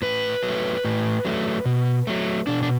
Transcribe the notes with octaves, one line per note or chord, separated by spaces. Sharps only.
A2 B4
F#3
A3
A2
F#3 A3
B2
F#3 A3
B2 D4
D4